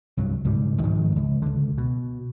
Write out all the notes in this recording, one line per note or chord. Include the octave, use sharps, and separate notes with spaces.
C2 G2 F#3
C#2 G#2 B2 G3
G#2 D#3 F3 G#3
C#2
C#2 D3
B2